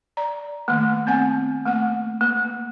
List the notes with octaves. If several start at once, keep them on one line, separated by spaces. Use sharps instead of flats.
D5 A#5
D#3 A3 A#3
B3 C4 F#5 G#5
A3 A#3 F#5
A#3